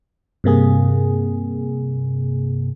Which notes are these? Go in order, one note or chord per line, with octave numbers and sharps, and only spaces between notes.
G2 C3 A#3 G#4